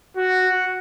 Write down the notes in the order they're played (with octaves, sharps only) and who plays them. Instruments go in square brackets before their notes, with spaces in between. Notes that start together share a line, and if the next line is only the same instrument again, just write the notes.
[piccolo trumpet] F#4